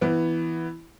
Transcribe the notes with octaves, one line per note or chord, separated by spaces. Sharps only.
E3 B3